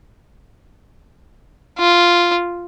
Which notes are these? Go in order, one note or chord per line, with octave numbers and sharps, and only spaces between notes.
F4